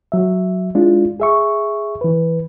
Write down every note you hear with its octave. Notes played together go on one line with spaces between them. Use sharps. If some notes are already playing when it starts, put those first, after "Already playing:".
F#3 E5
G#3 D4 E4 F4
G#4 E5 C#6
E3 B4